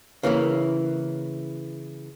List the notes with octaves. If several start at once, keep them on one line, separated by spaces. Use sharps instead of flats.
C#3 E3 A#3 E4